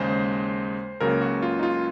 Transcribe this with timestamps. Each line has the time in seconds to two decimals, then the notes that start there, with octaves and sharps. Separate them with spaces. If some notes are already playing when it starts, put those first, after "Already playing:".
Already playing: D#2 C#3 G#3 C5
1.00 C#2 C#3 F#3 A#3 A#4
1.21 F#4
1.42 F4
1.59 D#4
1.63 F4